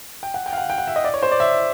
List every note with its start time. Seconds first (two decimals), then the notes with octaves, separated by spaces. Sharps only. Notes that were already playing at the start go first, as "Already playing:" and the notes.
0.23 G5
0.34 F#5
0.46 G5
0.53 F5
0.58 F#5
0.70 G5
0.78 F#5
0.87 E5
0.96 D#5
1.04 D5
1.14 C#5
1.23 C5
1.31 D5
1.40 E5